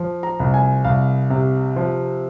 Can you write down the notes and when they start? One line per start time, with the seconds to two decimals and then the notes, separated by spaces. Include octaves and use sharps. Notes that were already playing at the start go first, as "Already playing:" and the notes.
Already playing: F3
0.23 A#5
0.40 C2
0.54 G#5
0.84 C2 F5
1.30 C3
1.76 F3